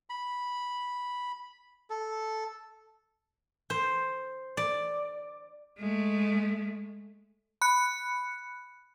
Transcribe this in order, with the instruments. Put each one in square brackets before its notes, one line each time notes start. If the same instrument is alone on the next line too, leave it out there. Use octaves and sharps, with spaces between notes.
[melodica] B5
A4
[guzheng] C5
D5
[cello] G#3 A3
[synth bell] B5 F#6 C#7